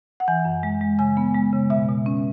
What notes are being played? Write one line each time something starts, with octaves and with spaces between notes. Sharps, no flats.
F#5
E3 G#5
F#2
G#3
G#3
C#3 G#5
B3
G#3
C#3
B2 E5
B2
C#4